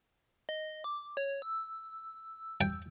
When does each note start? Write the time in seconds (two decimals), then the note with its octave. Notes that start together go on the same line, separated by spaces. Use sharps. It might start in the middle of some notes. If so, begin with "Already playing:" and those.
0.49 D#5
0.84 D6
1.17 C#5
1.42 E6
2.61 G5